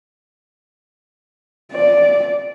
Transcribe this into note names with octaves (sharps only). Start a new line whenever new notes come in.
D5